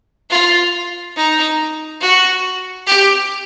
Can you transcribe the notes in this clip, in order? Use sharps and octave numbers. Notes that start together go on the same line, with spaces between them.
F4
D#4
F#4
G4